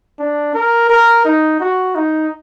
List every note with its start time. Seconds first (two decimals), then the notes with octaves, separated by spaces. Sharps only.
0.19 D4
0.54 A#4
0.90 A#4
1.25 D#4
1.60 F#4
1.95 D#4